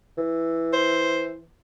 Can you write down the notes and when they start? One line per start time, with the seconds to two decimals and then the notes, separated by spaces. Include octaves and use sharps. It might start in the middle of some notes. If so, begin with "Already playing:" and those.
0.18 E3
0.73 C5